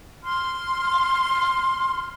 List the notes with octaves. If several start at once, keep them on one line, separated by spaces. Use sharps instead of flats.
C6 F6